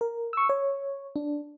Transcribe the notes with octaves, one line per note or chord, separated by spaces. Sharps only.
A#4
C#6 E6
C#5
D4